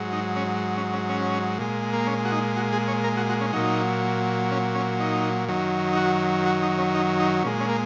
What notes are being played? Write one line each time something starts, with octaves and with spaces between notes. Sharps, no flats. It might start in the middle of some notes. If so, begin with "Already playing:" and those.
Already playing: G#2 F#3
D#4
C#4
C#4
C#4
C#4
A#2 G#3
A#3
C#4
F#4
D#4
F#4
G#4
C#5
A#4
F#4
F#4
C#4
A#2 F#3 D#4
C#4
C#4
D#4
F#2 D#3 F#3
D#4
F#4
F#4
D#4
C#4
D#4
D#4
A#2 G#3 C#4
C#4
A#3